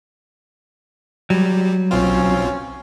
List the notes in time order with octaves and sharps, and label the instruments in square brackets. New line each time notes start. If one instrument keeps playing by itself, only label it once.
[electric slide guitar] F#3 [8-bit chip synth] G3
[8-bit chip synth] B1 C4 F4 [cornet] C#4